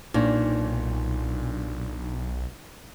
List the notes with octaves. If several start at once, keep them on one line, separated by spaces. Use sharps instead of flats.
B1 A#2 D4 D#4